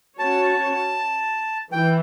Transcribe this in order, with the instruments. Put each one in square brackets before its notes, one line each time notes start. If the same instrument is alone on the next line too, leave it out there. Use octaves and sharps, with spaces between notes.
[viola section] C#4 F#4 C#5 [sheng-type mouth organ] A5
[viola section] E3 [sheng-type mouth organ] G5